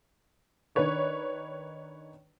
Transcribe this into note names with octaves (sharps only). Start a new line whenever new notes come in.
D#3 D4 B4 C#5 D5